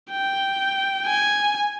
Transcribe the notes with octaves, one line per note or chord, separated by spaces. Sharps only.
G5
G#5